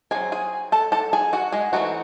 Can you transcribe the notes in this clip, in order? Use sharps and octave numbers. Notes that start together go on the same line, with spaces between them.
D#3 F#3 C4 G#4 G#5
G#4 G#5
A4 A5
A4 A5
G#4 G#5
F#4 F#5
G#3 G#4
E3 F#3 A3 C4 D#4 F#4